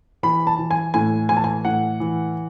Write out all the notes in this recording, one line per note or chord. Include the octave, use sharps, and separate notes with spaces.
E3 B5
A5
E3
G#5
A2 G#5
E3 G#5
A5
G#5
A2 F#5
E3